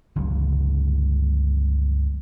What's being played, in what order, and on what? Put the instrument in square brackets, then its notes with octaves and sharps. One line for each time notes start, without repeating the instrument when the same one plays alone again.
[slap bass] G1 C#2 C#3 F#3